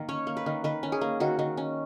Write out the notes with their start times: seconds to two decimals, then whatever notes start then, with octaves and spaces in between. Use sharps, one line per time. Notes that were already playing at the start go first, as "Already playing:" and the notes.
Already playing: D#3 A#3
0.09 C#4 C#5
0.27 A#3
0.37 B4
0.46 D#3
0.64 D#3 B4
0.83 C#4
0.92 G#4
1.01 A#3
1.20 D#3 F#4
1.39 D#3
1.57 C#4